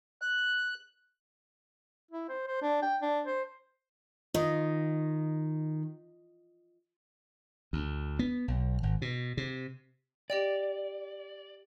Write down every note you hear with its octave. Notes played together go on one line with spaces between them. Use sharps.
F#6
E4
C5
C5
D4
G5
D4
C5
D#3 F4 D#5
D2
B3
B1
G#1
B2
C3
G4 D5 D#5 G5